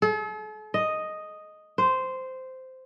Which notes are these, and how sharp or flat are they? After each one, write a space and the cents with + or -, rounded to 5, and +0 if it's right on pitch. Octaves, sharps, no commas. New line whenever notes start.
A4 -45
D#5 +0
C5 -10